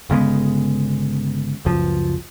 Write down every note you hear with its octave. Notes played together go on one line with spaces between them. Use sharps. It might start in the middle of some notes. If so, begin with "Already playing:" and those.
G1 C#3 G#3 B3
F#1 C#2 F3